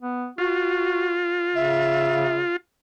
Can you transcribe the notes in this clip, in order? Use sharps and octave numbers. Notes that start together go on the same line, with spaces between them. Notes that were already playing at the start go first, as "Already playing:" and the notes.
B3
F4 F#4
C#3 E5